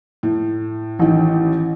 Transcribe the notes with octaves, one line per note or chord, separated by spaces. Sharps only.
A2
A1 D#3